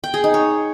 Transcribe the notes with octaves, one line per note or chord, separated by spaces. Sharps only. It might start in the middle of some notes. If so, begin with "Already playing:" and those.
G5
G#4
D#4
C#5